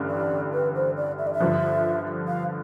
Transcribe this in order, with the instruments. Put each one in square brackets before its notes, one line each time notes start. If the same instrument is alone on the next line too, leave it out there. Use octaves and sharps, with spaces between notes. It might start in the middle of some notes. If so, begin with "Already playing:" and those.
Already playing: [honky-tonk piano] A1 G2 D3 G3
[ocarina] D5
B4
C5
D5
E5
D5
E5
[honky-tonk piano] G2 D3 F3
[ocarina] F5